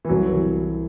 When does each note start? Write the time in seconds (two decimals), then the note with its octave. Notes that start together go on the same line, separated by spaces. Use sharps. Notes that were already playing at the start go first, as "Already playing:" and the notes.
0.05 E3
0.09 C2 F#3
0.33 E3